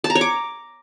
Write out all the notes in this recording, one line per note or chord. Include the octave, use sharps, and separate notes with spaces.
A5
A#5
C#5
D6